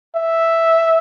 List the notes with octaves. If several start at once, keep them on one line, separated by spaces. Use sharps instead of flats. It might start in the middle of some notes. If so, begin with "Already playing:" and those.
E5